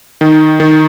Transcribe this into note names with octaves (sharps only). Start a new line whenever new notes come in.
D#3
D#3